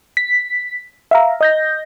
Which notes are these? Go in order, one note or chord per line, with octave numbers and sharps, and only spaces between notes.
B6
E5 F5 A#5
D#5 G6 A#6